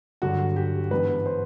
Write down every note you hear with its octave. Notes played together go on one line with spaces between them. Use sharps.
G2 D3 F#3 F#4
G4
G#2 E3 G#3 B3 D4 B4
C5